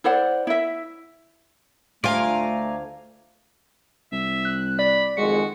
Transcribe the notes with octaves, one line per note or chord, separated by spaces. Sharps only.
E4 C5 D5 F#5
E4 E5
D2 A3 F4 D5 F5 G#5 A#5
C2 E5
F#6
D5 B5
F2 D#3 G#3 F#4 C#7